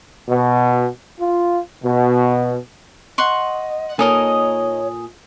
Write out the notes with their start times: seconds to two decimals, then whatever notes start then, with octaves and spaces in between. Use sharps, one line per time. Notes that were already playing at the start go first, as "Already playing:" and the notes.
0.29 B2
1.20 F4
1.84 B2
3.18 D#5 F#5 C6 C#6
3.99 A#2 D#4 A4 A#4 C#5 D#5 G#5 D#6